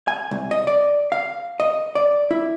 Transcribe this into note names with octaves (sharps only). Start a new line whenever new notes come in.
G#5
C2
D#5
D5
F5
D#5
D5
E4